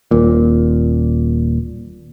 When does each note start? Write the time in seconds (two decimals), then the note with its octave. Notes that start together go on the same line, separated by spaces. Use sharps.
0.11 D#1 A#2